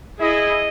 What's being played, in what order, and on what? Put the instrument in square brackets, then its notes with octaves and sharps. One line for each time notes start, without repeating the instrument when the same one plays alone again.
[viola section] E4 G#4 [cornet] D#5